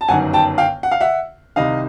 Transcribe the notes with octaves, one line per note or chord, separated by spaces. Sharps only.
A5
G1 F#2 D#3 F#5 G#5
G5 A5
F5 G5
F#5
F5
E5 F#5
C2 C3 D#3 D#5 F5